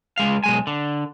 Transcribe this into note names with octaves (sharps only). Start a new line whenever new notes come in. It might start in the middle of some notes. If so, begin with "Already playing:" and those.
C#2 G#3 F5
B1 G#3 G#5
D3